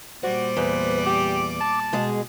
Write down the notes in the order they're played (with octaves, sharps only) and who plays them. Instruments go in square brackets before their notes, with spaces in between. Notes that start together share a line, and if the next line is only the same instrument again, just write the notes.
[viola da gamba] A#2 G3 D5 [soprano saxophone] F#4 [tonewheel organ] C5
[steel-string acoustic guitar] E2 [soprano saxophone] B4
[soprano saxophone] G4 [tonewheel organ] D6
[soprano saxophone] A5
[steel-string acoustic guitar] B2 G#3 G#4